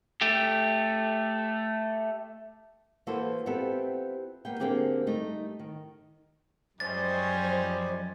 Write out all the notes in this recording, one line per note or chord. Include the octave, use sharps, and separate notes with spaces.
A3 G4
E3 A#3 F#4 A4 B4 C5
B3 C4 E4 F4 G4 A4
A#3 B3 G5
D3 A#3 C4 G4 G#4 A#4
G3 A3 D#4
D#3
F#2 F3 G3 G#3 C#4 C5 A6